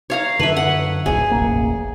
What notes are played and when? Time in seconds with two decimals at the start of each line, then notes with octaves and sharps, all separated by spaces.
0.10 C#5 F5 A#5
0.40 F#2 D3 B4 E5
0.57 F#5
1.06 D1 A#1 F#2 G#4
1.31 E1 A1 A#3